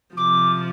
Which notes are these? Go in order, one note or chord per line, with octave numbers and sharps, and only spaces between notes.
C3 F3 D6